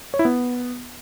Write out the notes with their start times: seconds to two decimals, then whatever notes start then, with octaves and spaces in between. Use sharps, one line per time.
0.14 C#5
0.19 E4
0.25 B3